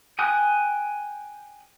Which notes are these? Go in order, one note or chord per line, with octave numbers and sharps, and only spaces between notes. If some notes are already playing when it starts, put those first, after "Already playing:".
G5 G#5 D#6 F#6